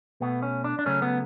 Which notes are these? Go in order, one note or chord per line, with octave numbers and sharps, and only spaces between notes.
B2 A3 B3
C#4
D4
D4
C#3 F#3 A3 C#4
B3